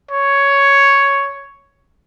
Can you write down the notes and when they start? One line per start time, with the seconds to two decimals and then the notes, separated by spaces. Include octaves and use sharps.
0.11 C#5